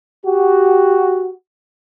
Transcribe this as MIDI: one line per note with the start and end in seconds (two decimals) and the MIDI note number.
0.25 1.32 66
0.25 1.32 67